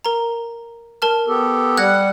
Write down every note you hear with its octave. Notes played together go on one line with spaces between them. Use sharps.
A#4 A#5
A#4 A5 F6
B3 G4 A4
G3 F#5 F#6 G#6 A#6